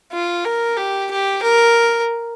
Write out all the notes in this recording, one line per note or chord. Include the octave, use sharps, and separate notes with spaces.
F4
A#4
G4
G4
A#4